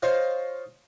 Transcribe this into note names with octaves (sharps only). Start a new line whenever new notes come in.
F4 C5 C#5 D#5 F5